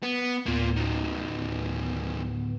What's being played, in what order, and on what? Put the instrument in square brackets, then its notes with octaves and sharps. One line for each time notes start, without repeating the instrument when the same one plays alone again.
[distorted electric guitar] B3
[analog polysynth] D2 A2 B3 [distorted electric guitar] A#3 F4
[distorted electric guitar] D#3 F#3